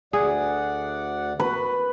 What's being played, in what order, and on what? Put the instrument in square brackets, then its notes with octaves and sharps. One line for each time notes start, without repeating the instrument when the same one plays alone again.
[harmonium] D2 D5 F#5 [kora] G#4
[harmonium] B3 F#4 [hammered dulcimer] B4